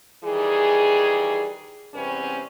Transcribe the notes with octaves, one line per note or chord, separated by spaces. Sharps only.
D#3 E3 G3 G#4
E2 C3 G3 C4 C#4 B4